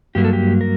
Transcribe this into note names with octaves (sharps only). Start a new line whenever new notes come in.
G2 F#3 A#3 G4
A4
G4
A#4